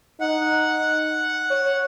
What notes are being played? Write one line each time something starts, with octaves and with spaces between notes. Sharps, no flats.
D#4 F#5
C#5